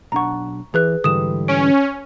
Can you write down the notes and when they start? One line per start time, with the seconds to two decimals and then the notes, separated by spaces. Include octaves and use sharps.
0.12 B1 D4 F#5 A#5 C#6
0.74 E3 G#4 B4 F#6
1.04 G#2 D3 E3 G3 D#6 E7
1.48 C#4 D7